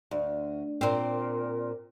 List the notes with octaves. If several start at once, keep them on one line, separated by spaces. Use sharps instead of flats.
D2
A#2 C4